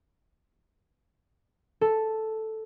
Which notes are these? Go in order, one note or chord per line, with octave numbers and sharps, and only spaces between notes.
A4